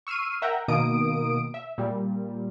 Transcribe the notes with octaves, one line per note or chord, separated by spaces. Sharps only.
C#6 E6 F6 C7 D#7
A#4 E5 F#5 G5 A#5
B2 D#3 A#3 D#6 D7
E5
A#2 G3